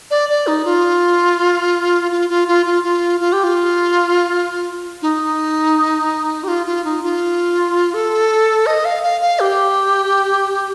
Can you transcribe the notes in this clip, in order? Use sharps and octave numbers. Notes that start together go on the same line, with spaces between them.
D5
D5
D#4
F4
F4
F4
F4
F4
F4
F4
G4
F4
D#4
G4
F4
F4
D#4
F4
A4
D#5
F5
F5
F5
G4